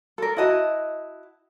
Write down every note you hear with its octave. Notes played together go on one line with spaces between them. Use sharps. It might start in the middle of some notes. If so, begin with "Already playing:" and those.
A4 A#4
E4 F#4 D#5 A5